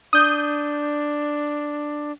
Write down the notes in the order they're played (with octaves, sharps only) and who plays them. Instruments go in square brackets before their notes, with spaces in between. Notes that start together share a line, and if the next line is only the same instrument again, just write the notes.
[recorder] D4 [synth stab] D#6 G6